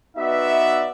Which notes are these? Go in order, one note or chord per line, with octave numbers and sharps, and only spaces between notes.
B3 D#4 F#4 B4 D5 E5